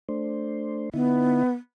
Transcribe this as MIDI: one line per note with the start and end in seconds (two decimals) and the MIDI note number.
0.09 0.90 57
0.09 0.90 62
0.09 0.90 72
0.94 1.43 50
0.94 1.50 59
0.94 1.43 63
0.94 1.43 64